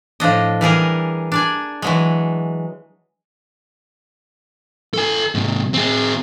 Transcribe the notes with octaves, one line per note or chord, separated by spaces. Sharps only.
A2 F3 D4 D#5
E3 G3 G#4 A#4
D4 D5 G#5
E3 F#3 G#3
A4 G#5
G#2 C3
C4 G#4